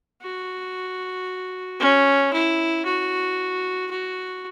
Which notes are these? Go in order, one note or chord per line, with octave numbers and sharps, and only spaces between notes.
F#4
C#4
E4
F#4
F#4